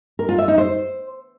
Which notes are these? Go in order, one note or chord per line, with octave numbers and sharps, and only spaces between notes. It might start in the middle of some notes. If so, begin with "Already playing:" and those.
A#4
F4
E5
D#4
C5